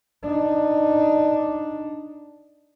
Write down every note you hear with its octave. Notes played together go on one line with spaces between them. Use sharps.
D4 D#4